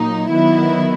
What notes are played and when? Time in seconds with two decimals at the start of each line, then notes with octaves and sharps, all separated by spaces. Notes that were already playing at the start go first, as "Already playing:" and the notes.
Already playing: A#2 F#3 A#3 D#4
0.30 D#3 F#3 B3 E4